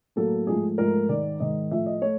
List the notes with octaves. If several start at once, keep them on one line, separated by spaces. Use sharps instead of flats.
A2 F#3 A#3 A4
G#2 F3 A3 G#4
G#2 F3 A3 A#4
G#2 D#3 G#3 D5
G#2 D#3 G#3 D#5
A2 F3 A3 E5
D#5
A3 C#5